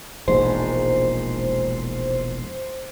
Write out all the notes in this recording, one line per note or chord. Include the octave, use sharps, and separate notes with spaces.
E1 A#1 G#2 C5